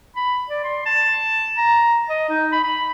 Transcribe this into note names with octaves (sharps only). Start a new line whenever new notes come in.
B5
D5
C6
A5
A#5
D#5
D#4
B5
B5